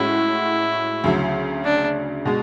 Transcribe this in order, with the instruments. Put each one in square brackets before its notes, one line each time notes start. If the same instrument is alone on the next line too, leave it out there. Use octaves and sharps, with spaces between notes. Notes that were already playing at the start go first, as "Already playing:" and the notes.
Already playing: [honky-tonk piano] A2 G#3 C#4 F#4 [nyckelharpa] E4
[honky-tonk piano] D2 C#3 F#3
[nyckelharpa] D4
[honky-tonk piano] B2 G#3